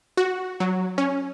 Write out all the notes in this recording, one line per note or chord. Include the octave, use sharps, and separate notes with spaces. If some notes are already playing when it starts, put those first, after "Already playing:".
F#4
F#3
C#4